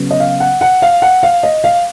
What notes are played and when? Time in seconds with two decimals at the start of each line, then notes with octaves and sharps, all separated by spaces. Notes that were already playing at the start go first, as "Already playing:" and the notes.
Already playing: C#3 F#3 B3
0.11 D#5
0.20 F5
0.40 F#5
0.61 F#5
0.82 F5
1.02 F#5
1.23 F5
1.43 D#5
1.64 F5